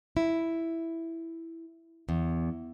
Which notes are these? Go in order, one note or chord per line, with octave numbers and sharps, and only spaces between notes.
E4
E2